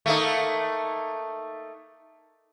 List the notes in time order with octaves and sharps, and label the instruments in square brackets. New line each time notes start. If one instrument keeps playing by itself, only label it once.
[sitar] A3 A#3 D#4